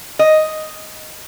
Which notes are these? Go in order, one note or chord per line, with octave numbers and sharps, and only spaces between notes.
D#5